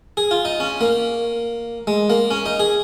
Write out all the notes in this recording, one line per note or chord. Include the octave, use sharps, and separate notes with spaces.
G#4
F4
D#4
C#4
A#3
G#3
A#3
C#4
D#4
G#4